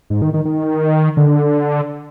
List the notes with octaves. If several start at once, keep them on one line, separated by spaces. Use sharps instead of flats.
G#2
D#3
D#3
D#3
D3